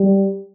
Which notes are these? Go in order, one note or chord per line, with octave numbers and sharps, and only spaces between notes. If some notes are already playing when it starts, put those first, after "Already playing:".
Already playing: G3